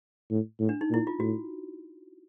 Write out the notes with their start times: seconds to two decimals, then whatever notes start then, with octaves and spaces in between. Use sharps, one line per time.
0.30 A2
0.60 A2
0.69 D4
0.81 D#4
0.90 A#2 E4
1.07 F4
1.19 A2 F#4